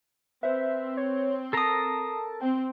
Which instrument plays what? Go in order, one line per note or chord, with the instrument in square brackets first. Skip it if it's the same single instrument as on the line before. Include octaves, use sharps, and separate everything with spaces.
[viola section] C4 [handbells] B4 C5 [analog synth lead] E5
[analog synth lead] C#5
[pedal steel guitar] A4 A#4 A#5 [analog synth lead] A5 [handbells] D#6 C7
[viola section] C4 [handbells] G5